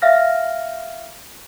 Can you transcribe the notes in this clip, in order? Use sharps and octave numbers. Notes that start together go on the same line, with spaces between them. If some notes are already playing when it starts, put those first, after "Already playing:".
E5 F5 F6 A#6